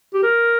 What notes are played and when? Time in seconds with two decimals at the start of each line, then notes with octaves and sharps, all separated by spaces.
0.14 G4
0.23 A#4